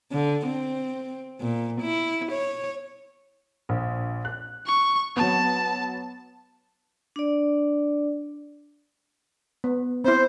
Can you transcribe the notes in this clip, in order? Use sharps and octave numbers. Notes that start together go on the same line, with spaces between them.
D3
C4
A#2
E4
C#5
A#1
F#6
C#6
F#3 B3 A5
D4 D5
B3
C4 E4 C5